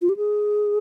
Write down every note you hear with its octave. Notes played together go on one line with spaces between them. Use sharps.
F4
G4
G#4